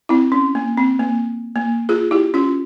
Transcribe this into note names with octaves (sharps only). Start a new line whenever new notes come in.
C4 E4
C#4
A#3
C4
A#3
A#3
F4 G#4
E4 G4
C#4 F4